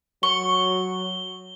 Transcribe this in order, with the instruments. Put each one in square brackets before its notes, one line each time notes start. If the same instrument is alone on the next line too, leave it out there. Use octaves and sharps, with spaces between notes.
[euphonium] F#3 [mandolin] C#6 [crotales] G7